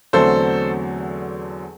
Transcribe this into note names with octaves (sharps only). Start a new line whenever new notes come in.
E2 D3 F#3 A3 C4 A4 C5